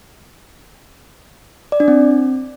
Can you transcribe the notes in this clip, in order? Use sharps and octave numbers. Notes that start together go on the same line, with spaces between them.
D5
D4
C4